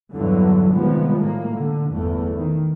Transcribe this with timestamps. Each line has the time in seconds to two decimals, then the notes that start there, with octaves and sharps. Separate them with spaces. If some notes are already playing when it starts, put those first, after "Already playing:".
0.13 A#1 E2 G2 D3 E3 F#3
0.73 C3 D#3 F3 G3 G#3 B3
1.18 A2 A#3
1.55 D3
1.91 G1 E2 A3
2.37 D#3